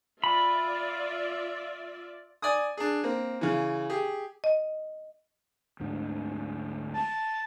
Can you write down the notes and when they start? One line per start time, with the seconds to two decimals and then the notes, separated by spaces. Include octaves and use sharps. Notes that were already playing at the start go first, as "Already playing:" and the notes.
0.24 F4 D5 E5 B5
2.42 D5 G#5 D#6
2.77 D4 G#4
3.03 A#3 C4
3.41 C#3 E3
3.90 G4 G#4
4.44 D#5
5.80 D2 G#2 D3
6.93 A5